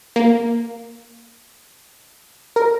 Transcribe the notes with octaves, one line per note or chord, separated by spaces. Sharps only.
A#3
A#4